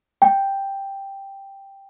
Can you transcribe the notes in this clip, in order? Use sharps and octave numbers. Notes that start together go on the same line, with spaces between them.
G5